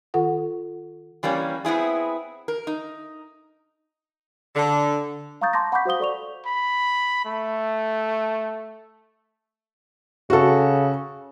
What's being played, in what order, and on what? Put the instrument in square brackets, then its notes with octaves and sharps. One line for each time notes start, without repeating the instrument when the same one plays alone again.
[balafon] D#3 F4 A4 F#5
[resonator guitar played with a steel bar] E3 G3 A#3 C#4
B3 C4 E4 G#4
A#4
D#4
[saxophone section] D3
[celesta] F5 A#5 C#6 D#6 G6 A6
A5 C6 D6 G6 A#6
F#5 B5 C#6 D6 G6 B6
F#4 C5 F5 D#6 G7
A4 D5 C#6 F7
[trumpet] B5
A3
[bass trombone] C#3 [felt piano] F#4 A4